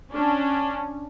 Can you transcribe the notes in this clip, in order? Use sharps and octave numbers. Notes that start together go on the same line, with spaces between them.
C#4 D4